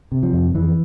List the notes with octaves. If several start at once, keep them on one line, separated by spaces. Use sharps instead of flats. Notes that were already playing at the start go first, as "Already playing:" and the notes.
C3
F3
F2
F2 E3